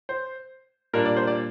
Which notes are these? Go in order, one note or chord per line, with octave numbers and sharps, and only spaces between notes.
C5
A#2 G3 A#3 D4 A#4
D5
C5
D5